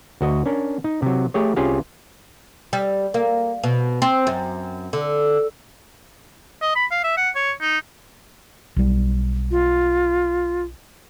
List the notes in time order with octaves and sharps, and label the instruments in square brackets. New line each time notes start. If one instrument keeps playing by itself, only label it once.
[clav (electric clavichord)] D2 F#4 D#5
C#4 D4 A#4
D#4
C3 F#3
A3 G4 G#4 C#5
C2 C#4 F4 G4 G#4 F5
[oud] G3
A#3
B2
C4
F#2
D3
[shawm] D#5
B5
F5
E5
F#5
C#5
D#4
[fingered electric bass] B1 G3
[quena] F4